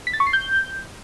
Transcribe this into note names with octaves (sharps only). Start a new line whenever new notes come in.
B6
A6
C#6
C7
G6